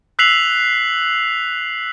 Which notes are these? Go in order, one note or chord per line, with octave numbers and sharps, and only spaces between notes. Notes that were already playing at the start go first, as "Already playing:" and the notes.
E6 F#6 B6 C7 F7 F#7